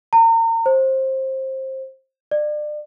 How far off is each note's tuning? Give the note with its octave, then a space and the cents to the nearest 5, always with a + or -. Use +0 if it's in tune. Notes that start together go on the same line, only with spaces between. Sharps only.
A#5 -35
C5 +20
D5 +30